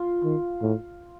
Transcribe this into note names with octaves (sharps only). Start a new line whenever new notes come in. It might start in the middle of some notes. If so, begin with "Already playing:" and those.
Already playing: F4
D#3
A2